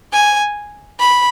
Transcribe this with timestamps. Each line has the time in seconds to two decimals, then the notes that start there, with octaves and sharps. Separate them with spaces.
0.13 G#5
1.00 B5